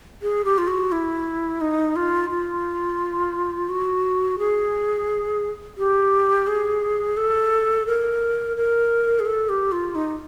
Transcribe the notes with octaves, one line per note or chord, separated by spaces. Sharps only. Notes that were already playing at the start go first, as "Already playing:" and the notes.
G#4
G4
F4
F#4
E4
D#4
F4
F4
F#4
G#4
G4
G#4
A4
A#4
A#4
G#4
A4
G4
F4
D#4